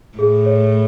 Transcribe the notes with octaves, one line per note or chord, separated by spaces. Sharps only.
A2 G#4
C#5